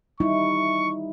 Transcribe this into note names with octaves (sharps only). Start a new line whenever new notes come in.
G3 D#4 E4 C#6